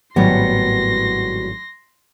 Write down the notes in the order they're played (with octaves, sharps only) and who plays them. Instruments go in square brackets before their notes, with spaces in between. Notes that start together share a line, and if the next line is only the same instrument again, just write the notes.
[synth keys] G#1 A2 [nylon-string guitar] F#3 G3 B3 [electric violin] C6 A#6